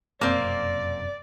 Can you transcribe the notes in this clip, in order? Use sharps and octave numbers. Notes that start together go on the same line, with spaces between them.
F1 F#2 B2 A#3 C4 D5